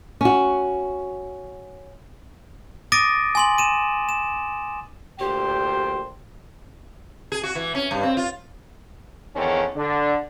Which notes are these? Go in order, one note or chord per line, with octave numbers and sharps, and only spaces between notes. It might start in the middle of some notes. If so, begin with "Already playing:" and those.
C#4 F#4
D6 D#6 A6 A#6 D7 D#7
G#5 C6 F#7
D#7 E7
E7
D2 A#2 G4 C5 G5
G#4
F#4
E3
C#4
G2
C4
F4
E2 D3 D#3 C4 C#4
D3 D4